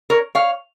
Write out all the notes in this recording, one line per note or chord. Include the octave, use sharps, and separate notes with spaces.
A#4 C#5
C#5 F5